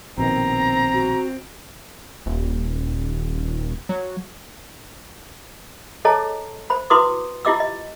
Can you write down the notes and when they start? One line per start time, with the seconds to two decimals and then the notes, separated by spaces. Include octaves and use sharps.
0.18 A#1 B2 D#3 C4 A#5
0.94 F#4
2.26 D#1
3.89 F#3
6.05 G#4 A4 C#5 D#5 A5 A#5
6.70 C5 B5
6.90 E4 F#4 B4 C6 D6 D#6
7.45 E4 F4 G4 D#5 D6 E6
7.60 D#5